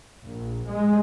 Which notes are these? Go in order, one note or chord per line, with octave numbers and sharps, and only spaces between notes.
A#1
G#3